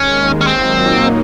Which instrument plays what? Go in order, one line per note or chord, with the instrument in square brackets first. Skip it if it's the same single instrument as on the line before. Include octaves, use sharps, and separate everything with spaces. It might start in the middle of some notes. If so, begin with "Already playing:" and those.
Already playing: [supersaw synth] D#2 D#3 G#3 [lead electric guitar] C#4
[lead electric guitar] C#4
[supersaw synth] A#2 F#3 A#3 D#4 [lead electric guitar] C4